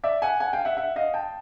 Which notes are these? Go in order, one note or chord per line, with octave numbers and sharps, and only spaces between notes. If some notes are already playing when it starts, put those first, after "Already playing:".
D5 E5
F#5 G#5
F#5 G#5
F5 G5
E5 F#5
E5 F#5
D#5 F5
G5 A5